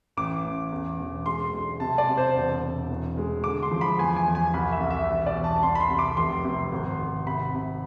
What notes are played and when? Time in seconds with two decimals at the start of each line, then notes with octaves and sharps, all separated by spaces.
0.17 A1 D6
0.44 A1
0.72 E2
0.99 E1
1.26 G#3 C6
1.53 B1
1.80 C3 A5
1.98 D5
2.08 C3
2.17 C5
2.36 E1
2.63 E1
2.90 E2
3.17 G#3
3.44 D3 D6
3.63 C6
3.71 F3
3.81 B5
3.98 E2 G#5
4.16 G#5
4.26 E2
4.35 G#5
4.54 C2 B5
4.72 E5
4.80 C2
4.90 E5
5.08 E1
5.26 D5
5.35 E2
5.44 A5
5.63 C2 C6
5.75 B5
5.81 C6
5.90 C3
5.99 D6
6.17 F1 C6
6.44 C3
6.72 G#1
6.99 G#1
7.26 C3 B5
7.54 C3